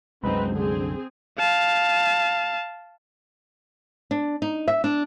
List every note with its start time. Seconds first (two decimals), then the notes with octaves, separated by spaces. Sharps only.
0.24 C2 F#2 G#3 C4 D#4 B4
0.54 D3 C4 G#4
1.39 F5 A5
4.11 D4
4.42 D#4
4.68 E5
4.84 D4